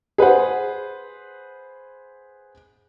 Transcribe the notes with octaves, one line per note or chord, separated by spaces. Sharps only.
G#4 B4 C5 F#5